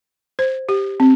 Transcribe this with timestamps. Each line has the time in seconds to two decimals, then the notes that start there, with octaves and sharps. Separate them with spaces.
0.39 C5
0.69 G4
1.00 C4